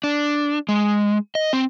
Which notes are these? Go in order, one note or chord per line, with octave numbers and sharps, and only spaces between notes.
D4
G#3
D#5
C4